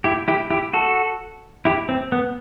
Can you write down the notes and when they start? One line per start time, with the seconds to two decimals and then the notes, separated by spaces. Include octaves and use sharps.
0.04 E4 G4
0.28 E4 G4
0.50 E4 G4
0.73 F#4 A4
1.65 E4 G4
1.89 C4
2.12 B3